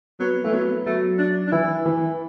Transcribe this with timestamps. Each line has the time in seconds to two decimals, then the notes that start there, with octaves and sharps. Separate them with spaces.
0.20 F#3 B3
0.44 E3 A3
0.53 F#3 B3
0.86 F#3 A3
1.19 D4
1.47 D4
1.52 E3 E4
1.86 E3